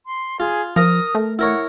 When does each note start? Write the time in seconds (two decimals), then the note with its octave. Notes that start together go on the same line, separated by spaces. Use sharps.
0.06 C6
0.40 F4 G#4
0.76 F3 A#4 A#5 D#6
1.15 A3
1.39 E4 A#4 C#5 F#5